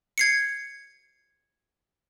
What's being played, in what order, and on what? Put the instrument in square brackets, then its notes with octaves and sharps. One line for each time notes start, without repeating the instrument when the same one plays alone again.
[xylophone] G#6 C7 C#7